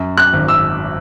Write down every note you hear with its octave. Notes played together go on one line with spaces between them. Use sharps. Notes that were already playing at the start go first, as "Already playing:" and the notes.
Already playing: F#2
F#6
G#1
E6